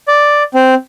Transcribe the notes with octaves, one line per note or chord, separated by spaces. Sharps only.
D5
C4